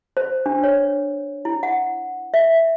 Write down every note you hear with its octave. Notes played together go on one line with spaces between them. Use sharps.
C5
D4
C#5
E4
F#5
E5